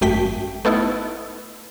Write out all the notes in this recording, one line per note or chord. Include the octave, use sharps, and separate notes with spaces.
G#1 F#2 A3 G5 B6
A3 B3 D#4 E4